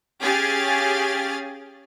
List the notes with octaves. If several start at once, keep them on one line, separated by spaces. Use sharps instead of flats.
C#4 G4 G#4 F5 G#5 A6